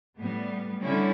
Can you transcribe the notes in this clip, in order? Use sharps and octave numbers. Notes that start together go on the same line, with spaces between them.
A2 G3 B3
D3 G3 C#4 E4